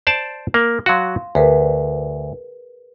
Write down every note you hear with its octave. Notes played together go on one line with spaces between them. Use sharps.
C5 D5 A5
A#3
F#3 F#4 F5 C6
D2 G#4 A#4 B4